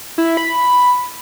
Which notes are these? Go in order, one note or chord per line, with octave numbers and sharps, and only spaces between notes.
E4
B5